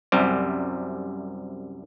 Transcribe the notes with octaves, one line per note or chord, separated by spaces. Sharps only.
C2 F#2 C3 G3